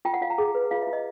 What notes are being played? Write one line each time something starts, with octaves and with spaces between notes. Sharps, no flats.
F4 G5
F#5
F4 F5
A#5
G#4
B4
F4 F5
E5
F4
D#5